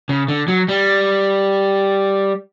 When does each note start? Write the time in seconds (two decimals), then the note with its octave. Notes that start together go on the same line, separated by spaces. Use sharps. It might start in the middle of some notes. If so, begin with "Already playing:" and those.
0.09 C#3
0.28 D3
0.48 F#3
0.69 G3